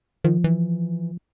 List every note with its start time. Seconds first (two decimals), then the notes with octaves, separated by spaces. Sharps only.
0.24 D#3 F3
0.44 E3